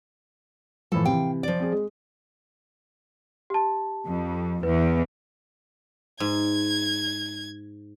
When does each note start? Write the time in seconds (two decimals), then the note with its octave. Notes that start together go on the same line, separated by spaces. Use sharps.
0.92 A2 E3 F3 A4
1.05 C3 E3 F5 G5
1.43 F3 D5
1.60 C4 G#4
1.72 G#3
3.50 G4 A5
4.06 F2
4.63 E2 B4
6.20 G#2 G#6